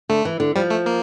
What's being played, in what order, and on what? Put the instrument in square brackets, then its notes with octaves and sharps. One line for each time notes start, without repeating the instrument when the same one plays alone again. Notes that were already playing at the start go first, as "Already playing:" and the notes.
[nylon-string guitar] D3 [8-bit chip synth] A3
[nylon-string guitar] E3
D3
[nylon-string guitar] F3 [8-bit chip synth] G3
[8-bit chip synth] A3
A#3